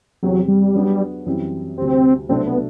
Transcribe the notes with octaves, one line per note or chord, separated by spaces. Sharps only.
E2 C3 F#3 G3 C4 G4
G3
F#3 B3 D4
F#2 E3 G3 C4
D2 C3 G3 C4
C2 B2 F#3 A3 C4 D4
B3